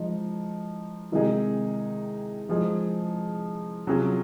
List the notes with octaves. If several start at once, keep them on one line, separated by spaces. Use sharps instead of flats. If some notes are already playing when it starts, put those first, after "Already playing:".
Already playing: F3 G#3 D#4
C3 D#3 G#3 D#4 G#4
F3 G#3 D#4 G#4
C3 F#3 C#4 F4 G#4